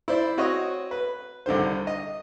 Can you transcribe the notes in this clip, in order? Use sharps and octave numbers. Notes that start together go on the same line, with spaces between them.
E4 C5 D5
C4 F#4 C#5 D#5 C#6 D#6
B4
C2 D3 D#3 C5
D#5